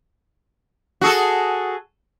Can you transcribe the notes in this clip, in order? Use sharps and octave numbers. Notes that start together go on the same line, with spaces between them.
F#4 G#4 A4